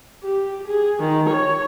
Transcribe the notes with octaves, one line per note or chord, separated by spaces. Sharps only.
G4
G#4
D#3
C#5